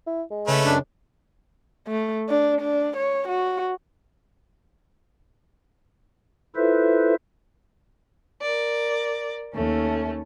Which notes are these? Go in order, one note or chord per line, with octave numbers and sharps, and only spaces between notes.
E4
G#3
C#3 A3 C#4 B4
F#2 D4 C#5
A3
D4
D4
C#5
F#4
E4 F4 A4 B4 C5 E5
A#4 D5
D#2 A3 C#4